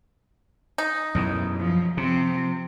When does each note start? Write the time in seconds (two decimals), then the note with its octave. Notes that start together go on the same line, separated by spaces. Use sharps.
0.78 D#4
1.15 F#2 B2 E3
1.59 F3 F#3
1.97 C3 F3 C4